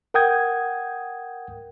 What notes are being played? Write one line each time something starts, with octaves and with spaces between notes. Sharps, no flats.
A#4 F#5 G5 D#6 G6 G#6